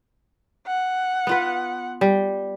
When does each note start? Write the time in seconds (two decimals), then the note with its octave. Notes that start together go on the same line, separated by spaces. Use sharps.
0.67 F#5
1.27 B3 F4 B4
2.01 G3